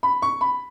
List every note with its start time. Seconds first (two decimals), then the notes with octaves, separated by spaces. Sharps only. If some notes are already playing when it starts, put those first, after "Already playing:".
0.03 B5
0.22 C#6
0.41 B5